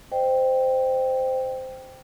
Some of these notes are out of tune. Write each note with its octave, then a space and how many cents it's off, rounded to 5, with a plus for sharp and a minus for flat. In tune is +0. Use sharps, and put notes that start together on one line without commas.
C5 -10 D#5 -30 G5 +0